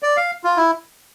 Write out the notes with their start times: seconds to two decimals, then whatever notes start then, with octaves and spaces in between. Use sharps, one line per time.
0.03 D5
0.17 F5
0.44 F4
0.57 E4